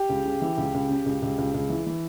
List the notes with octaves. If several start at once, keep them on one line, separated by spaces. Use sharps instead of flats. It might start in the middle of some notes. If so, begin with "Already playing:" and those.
Already playing: G4
C#2
C#3
E3
C#2
C#2
C#3
C#2
C#2
C#2
C#2
E3
E3